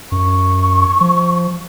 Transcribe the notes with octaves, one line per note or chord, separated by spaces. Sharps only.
F#2 C#6
F3